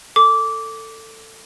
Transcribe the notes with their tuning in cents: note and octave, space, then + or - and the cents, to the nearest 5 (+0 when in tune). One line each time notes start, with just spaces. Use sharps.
A4 +20 D6 -15